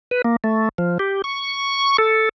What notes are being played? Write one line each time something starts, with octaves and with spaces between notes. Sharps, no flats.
B4
A#3
A3
F3
G4
C#6
A4